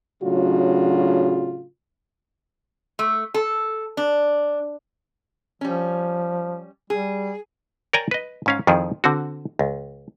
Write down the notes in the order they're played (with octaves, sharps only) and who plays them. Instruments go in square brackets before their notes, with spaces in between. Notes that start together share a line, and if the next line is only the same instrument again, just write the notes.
[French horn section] A2 C#3 F#3 D4 F4 F#4
[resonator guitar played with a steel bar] A3
A4
D4
[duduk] F3 [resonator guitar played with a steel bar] G3 C#4
[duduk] G3 [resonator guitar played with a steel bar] G#4
[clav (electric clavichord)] A#4 C#5 D5 G5 G#5 A#5
B4 D#5
G#2 C#4 F5
F2 D#3 F3 E4 G#4
D3 C4 F#4
C#2